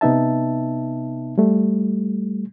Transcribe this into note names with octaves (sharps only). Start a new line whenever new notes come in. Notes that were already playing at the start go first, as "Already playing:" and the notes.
C3 B3 D#4 E5 A5
G3 A3